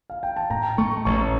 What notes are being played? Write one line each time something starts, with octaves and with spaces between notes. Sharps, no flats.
F5
G5
A5
A2 G5 A#5
A3 A5 C#6
A1 A5 C#6